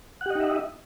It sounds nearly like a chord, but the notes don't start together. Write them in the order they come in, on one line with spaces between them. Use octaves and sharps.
F#5 G4 D#5 D#4 E5